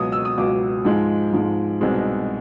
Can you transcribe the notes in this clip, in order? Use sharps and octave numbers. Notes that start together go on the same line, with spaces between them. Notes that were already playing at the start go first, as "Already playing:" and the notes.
Already playing: C#2 B2 F#3 D#6
E6
D#6
C#2 B2 F#3 D6
G#2 F3 G#3
G#2 F3 G#3
C2 B2 G#3 C4 D#4